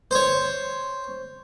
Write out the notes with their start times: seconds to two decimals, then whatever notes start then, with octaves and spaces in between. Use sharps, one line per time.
0.11 C5 C#5